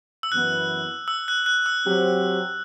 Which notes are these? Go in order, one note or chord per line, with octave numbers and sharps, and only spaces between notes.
E6
F#2 E3 B3 F#6
E6
F#6
F#6
E6
F#3 C4 G4 C5